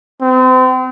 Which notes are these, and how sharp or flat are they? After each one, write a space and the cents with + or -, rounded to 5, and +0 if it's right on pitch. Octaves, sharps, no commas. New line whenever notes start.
C4 -35